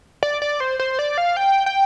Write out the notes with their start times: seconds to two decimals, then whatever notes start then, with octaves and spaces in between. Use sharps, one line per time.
0.23 D5
0.42 D5
0.60 C5
0.79 C5
0.99 D5
1.18 F5
1.37 G5
1.66 G5